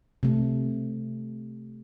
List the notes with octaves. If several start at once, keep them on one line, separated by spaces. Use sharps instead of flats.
C3 A3